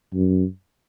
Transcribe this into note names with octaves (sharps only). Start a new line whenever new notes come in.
F#2